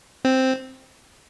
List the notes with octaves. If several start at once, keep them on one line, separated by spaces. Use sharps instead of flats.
C4